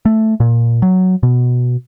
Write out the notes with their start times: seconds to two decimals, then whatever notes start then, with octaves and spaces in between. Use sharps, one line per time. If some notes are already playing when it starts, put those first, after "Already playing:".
0.05 A3
0.40 A#2
0.82 F#3
1.23 B2